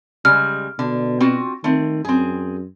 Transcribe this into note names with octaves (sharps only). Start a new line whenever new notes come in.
C#3 G3 G#3 F6
B2 D3
C4 F4 F#4
D#3 A3 C4
F#2 C4 G#4